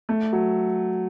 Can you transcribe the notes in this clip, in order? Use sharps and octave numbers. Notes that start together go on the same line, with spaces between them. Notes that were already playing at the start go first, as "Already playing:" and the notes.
A3
F#3